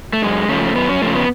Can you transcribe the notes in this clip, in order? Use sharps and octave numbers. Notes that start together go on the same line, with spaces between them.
A3
F#2 G#3
C#3 F3 A3
F#2 B3
C#4
C#3 F3 A3
B3